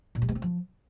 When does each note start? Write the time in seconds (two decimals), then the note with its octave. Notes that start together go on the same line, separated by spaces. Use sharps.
0.15 A#2
0.22 G3
0.28 G#3
0.35 C4
0.42 F3